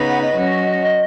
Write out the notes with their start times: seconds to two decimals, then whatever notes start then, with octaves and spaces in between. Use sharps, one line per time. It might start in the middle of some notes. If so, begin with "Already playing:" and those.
Already playing: C#3 B3 D#4 B4
0.08 F#5
0.21 D#5
0.34 F#3 C#4 F#4